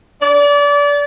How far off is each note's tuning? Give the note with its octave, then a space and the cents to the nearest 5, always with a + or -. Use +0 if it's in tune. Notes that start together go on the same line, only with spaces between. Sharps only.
D5 -30